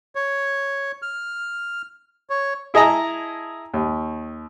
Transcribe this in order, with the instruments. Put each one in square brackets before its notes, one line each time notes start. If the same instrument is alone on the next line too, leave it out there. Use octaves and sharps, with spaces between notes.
[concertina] C#5
F6
C#5
[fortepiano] E4 G#4 D#5 A5 A#5
D#2